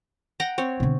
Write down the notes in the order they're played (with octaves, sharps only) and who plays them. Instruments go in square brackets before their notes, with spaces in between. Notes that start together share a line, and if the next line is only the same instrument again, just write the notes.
[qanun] F#5 G5 A#5
C4 C#5
[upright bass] B2 D3